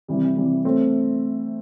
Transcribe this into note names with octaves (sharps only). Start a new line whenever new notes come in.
C3 E3 G3
C3 E3 G3
A3 C4